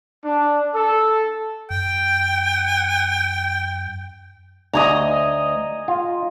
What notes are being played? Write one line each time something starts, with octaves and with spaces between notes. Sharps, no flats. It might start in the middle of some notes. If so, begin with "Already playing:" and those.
D4
A4
F#2 G5
D2 D#5 G#5 A#5
F4